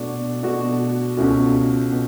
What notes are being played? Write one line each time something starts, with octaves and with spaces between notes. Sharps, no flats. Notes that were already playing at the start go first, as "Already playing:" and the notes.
Already playing: B2 A3 D4 F#4
B2 A3 D4 F#4
C#2 B2 A3 C#4 F#4
B2